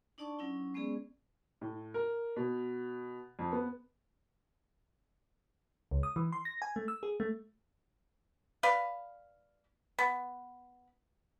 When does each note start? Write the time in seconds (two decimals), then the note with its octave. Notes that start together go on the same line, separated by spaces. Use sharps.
0.18 D4 D#4 D5 A5 C#6 D6
0.39 F#3 C#4 D#4 E4
0.74 G#3 B3 C#4 G#4 D5
1.61 A2
1.94 A#4
2.37 B2
3.39 F2
3.52 B3
5.91 C#2
6.03 D#6
6.16 E3
6.32 C6
6.45 A#6
6.62 G#5
6.76 A3
6.88 E6
7.03 G#4
7.20 A3
8.63 B4 D5 F5
9.99 B3